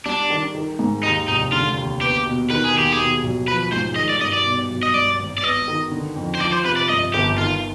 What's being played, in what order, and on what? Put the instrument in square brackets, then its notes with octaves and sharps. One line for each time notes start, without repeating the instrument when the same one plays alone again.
[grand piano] G3 [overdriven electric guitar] D4
[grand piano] D#3
D#3
G#2
[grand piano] D#2 [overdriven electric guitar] D#4
[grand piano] F1 [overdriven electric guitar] D#4
[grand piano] D3 [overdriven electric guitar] F4
[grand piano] D#2
[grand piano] B3 [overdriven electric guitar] G4
[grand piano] B2
[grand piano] D#3 [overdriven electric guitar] B4
[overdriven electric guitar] G#4
[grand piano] D#2 [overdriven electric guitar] G4
[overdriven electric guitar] G#4
[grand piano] B2
B1
[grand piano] F3 [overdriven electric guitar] B4
[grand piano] G#2 [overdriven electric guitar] C5
[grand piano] D#3 [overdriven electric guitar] D#5
[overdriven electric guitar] D5
[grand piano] G2 [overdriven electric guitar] D#5
[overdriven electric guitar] D5
[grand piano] B2
B1
[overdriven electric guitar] D#5
[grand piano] G2 [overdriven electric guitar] D5
[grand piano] G#1
[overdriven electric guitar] D5
[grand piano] B3 [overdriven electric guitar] D#5
[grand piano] D#3
D3
F2
[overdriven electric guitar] C5
[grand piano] F3 [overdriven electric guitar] D5
[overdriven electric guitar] C5
[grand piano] C3 [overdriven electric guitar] B4
[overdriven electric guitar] D5
[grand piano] G2 [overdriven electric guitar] D#5
[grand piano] G1 [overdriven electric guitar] G4
[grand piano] D#3 [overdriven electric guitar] F4